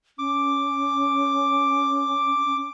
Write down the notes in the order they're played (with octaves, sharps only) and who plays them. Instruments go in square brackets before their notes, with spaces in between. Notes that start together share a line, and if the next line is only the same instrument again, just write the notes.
[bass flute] C#4 [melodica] D6